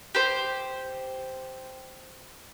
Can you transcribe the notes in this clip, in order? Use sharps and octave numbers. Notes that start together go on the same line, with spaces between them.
G4 C5